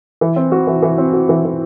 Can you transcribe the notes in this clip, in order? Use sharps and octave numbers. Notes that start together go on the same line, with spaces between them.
E3
C4
F#4
E3
E3
C4
F#4
E3
E3